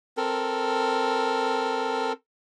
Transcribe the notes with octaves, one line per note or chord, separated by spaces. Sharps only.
C4 A4 A#4